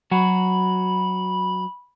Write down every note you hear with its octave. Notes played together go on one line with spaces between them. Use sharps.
F#3 F#4 B5